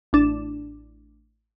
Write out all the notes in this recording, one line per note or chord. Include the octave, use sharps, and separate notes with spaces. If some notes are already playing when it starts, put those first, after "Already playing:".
A1 D4 E7